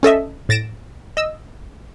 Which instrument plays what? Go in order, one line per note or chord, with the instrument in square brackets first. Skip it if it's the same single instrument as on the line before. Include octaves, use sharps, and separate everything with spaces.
[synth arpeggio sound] C#4 A4 D#5 E5
A2 A6 A#6 D7 E7
D#5 E6